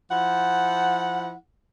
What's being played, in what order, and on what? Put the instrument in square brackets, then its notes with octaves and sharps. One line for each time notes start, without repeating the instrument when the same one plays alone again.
[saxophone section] F3 E4 F#5